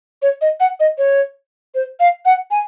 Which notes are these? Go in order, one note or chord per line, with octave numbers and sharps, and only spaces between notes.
C#5
D#5
F#5
D#5
C#5
C5
F5
F#5
G#5